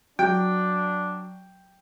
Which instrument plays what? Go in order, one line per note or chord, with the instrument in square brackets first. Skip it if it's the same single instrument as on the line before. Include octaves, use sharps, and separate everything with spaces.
[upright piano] F#3 [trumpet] D4 [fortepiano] G5